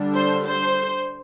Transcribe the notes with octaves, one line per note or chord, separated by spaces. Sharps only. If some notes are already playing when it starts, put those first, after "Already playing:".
Already playing: D3 G3 D4
C5
C5